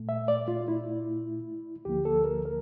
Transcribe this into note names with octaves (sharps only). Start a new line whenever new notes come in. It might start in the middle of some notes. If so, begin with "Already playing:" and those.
Already playing: A#2 A3
E5
D5
F4
E4
D2 D3 F3 A#3 G4
A4
A#4
A#4